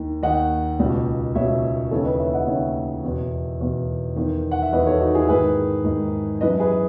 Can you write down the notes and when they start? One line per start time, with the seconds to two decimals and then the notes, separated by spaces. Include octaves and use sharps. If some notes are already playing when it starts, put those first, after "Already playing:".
Already playing: D#2 D#3
0.23 D#2 D#3 D#5 F#5
0.79 C#2 B2
1.35 C#2 B2 C#5 E5
1.91 D#2 C#3 E3 A4 C#5
2.05 B4 D#5
2.19 C#5 E5
2.34 D#5 F#5
2.47 D#2 C#3 E3 C#5 E5
3.04 E2 B2
3.60 E2 B2
4.16 E2 D#3
4.51 F#5
4.62 E5
4.72 E2 B4 D#5
4.77 D#3
4.87 A4 C#5
5.01 D#4 F#4
5.15 E4 G#4
5.29 G#2 D#3 G#4 B4
5.84 G#2 D#3
6.41 F#2 E3 B4 D#5
6.60 G#4 B4